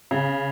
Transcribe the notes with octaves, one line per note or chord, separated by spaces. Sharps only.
C#3